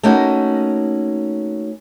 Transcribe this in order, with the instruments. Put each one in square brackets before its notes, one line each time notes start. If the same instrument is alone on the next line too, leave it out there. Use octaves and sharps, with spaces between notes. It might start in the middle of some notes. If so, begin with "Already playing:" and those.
[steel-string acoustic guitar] A3 A#3 C#4 D#4 F#4